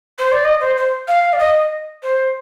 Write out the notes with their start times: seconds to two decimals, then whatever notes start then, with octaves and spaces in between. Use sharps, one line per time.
0.18 C5
0.31 D5
0.44 D#5
0.60 C5
0.76 C5
1.07 F5
1.32 D5
1.38 D#5
2.02 C5